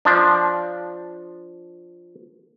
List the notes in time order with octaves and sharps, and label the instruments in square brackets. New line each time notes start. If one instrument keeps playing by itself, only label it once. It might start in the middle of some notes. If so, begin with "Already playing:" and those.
[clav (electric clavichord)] F3 D4